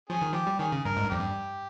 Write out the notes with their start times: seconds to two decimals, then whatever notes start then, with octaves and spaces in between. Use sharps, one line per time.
0.10 F3 C#4 G#4
0.22 D#3
0.34 F3 G4
0.47 G3
0.59 D#3 C#4 G#4
0.72 C#3
0.85 G2 A#4
0.97 G#2
1.05 G2
1.10 F2 G4
1.19 G2